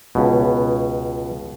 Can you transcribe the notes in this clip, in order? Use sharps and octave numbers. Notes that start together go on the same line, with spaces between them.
C#2 B2